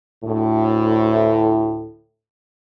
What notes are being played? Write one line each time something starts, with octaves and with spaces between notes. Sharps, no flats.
D2 A2